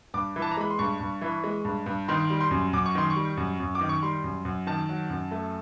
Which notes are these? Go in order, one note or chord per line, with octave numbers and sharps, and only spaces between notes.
G2 D6
E3
A5
A#5
G#3 B5
C6
G2 C#6
G2
E3
G#3
G2
G2
D#3 C6
G3
C6
F#2
F#2 D6
C#6
D#3 C6
C#6
G3
F#2
F#2
D6
D#3
C#6
G3 C6
F#2
F#2
D#3 A5
F#3
F#2
A3